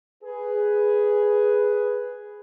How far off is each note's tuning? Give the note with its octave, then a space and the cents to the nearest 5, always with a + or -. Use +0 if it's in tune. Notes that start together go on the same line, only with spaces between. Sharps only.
G#4 +0 B4 +0